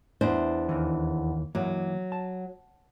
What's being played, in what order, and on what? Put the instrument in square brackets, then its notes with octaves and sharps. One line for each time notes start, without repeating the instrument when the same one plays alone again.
[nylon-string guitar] E2 D4 C5
[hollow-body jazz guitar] D#2 E3
[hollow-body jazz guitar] E3 A#3 [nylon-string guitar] F#3
[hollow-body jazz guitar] A5